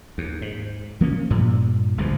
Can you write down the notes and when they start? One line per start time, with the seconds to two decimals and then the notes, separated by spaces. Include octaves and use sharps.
0.18 D#2
0.42 G#2
1.01 F3 A#3 C#4
1.30 G2 A#2
1.98 G1 C#2 G2 F3